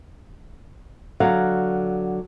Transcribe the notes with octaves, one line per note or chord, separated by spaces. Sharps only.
D3 F#3 F5 F#5